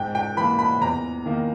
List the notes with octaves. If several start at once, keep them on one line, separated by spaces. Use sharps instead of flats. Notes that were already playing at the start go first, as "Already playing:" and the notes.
Already playing: G#2 G5
G5
E3 A#3 B5
B5
E2 A#5
D#3 A#3